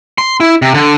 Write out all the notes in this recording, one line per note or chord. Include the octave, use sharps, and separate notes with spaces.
C6
E4
C3
D3